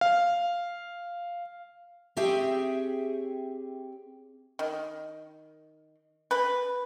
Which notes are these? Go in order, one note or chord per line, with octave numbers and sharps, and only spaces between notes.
F5
C4 G4 G#4 C#5 E5 G5
D#3
B4